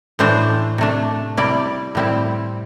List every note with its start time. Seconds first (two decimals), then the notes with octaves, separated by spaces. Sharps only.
0.19 A2 E3 A3 D4 C5
0.78 C3 A3 D4
1.37 C3 G3 E4 D5
1.95 A2 G3 C4 E4